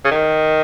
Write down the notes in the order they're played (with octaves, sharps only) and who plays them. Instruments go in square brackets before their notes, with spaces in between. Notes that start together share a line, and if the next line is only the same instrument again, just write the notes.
[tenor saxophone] C#3
D#3